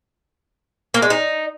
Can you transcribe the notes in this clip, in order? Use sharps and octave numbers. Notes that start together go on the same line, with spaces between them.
A#3
G#3
D#4